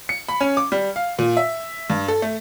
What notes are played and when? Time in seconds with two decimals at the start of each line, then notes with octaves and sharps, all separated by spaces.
0.09 C#7
0.28 B5
0.41 C#4
0.57 D6
0.72 G3
0.96 F5
1.19 A#2
1.37 E5
1.90 G2
2.08 A4
2.22 A3